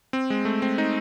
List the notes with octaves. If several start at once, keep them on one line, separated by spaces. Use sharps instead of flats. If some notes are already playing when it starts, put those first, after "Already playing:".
C4
G#3
A3
C4
D#4